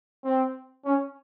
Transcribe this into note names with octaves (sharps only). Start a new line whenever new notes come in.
C4
C#4